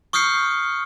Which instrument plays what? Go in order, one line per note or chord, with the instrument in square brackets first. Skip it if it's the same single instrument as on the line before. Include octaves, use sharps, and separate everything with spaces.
[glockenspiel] C#6 D#6 F6 G6 C7 C#7